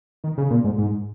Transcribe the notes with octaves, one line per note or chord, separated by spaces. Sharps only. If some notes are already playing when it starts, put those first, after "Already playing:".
D#3
C#3
A#2
G#2
G#2